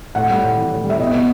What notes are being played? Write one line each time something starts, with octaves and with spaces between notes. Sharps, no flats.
A2 F#5
G3
A2
E3
A2
G3
E5
B2 D#5
B3